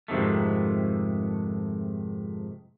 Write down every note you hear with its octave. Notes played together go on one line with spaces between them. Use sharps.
F2 G#2 C3 D#3 A3